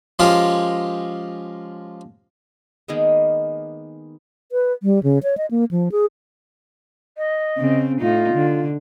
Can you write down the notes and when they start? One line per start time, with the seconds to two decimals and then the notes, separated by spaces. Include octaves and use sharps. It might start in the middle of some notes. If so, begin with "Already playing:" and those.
0.19 F3 G#3 C#4 F4 G4 A#4
2.88 D#3 G#3 A#3 B3
4.52 B4
4.83 G3
5.03 C#3
5.23 C#5
5.38 D#5
5.51 A#3
5.71 F3
5.92 G#4
7.18 D#5
7.57 C#3 C4
8.01 A2 D#4 F4
8.33 D3